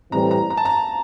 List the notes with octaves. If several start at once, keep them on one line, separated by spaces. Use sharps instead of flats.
A2 E3 G3 C4 A#5
A#5
A#5
A5
A#5